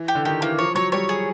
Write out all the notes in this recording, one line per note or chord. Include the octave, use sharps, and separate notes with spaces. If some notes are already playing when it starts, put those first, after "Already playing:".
Already playing: E3
G4
D3
D#3 G4
E3 A#3
F3 C#5
F#3 C#5
G3 C#5
G#4